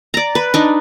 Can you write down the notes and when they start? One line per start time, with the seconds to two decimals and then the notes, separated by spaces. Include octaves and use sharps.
0.14 D5 A#5
0.35 B4
0.54 D4 D#4